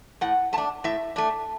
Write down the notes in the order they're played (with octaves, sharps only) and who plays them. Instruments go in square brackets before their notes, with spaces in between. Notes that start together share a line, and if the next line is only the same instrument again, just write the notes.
[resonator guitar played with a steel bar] A2 F#5
A3 A5
D4
A2 E5
A3 D4